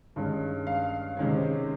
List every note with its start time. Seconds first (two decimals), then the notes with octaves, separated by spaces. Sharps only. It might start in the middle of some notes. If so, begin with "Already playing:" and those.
0.16 G2 D#3 G#3 C#4
0.67 F5
1.17 C3 D#3 G#3 C#4